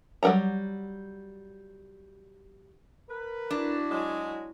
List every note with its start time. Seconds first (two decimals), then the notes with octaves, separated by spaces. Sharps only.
0.23 F#3 G3 A#4 F#5 A#5
3.09 A#4 B4
3.51 D4 E4 F#4
3.90 F#3 G#3